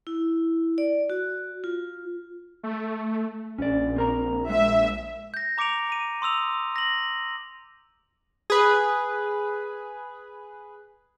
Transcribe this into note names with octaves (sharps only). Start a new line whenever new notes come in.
E4
D5
F#4
F4
A3
A#1 C#4 D5
C4 A#4 A#5
G#3 E5
G6 A#6
A#5 D6 C#7 D7 F7
A#5 D#7
C6 D#6 E6 F7
A#6 F#7
G#4 B4